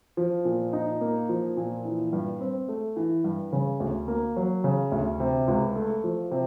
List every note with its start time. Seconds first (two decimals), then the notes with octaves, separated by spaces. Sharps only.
0.17 F3
0.45 A#2
0.73 D#4
1.01 A#3
1.29 F3
1.57 A#2
1.85 E3
2.13 G2
2.41 C4
2.68 A3
2.96 E3
3.24 G2
3.52 C#3
3.80 D2
4.08 A#3
4.36 F#3
4.64 C#3
4.92 D2
5.20 C3
5.48 C#2
5.76 A3
6.04 F3
6.31 C3